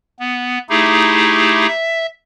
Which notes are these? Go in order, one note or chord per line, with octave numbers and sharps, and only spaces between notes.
B3
A3 D#4 E4 G4 G#4
E5